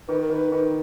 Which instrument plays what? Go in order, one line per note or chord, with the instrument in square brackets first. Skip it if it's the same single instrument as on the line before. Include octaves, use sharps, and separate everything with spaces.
[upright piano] D#3 [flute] B4
[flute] A#4
[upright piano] D#3 [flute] B4
[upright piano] D#3